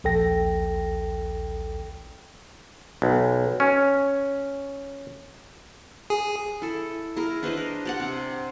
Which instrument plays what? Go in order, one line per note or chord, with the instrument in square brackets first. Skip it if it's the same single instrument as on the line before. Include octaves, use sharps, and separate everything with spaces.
[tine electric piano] A#1 D#2 A4 G5 A#6
[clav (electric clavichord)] B1
C#4
[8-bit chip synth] G#4
[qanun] E4 A4
E4 G#4 A#4
D4 B4 C5 D#5
A#4
G4 D5 F#5
C3